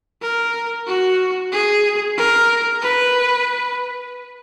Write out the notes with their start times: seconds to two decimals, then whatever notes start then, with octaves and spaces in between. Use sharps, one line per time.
0.22 A#4
0.87 F#4
1.53 G#4
2.17 A#4
2.82 B4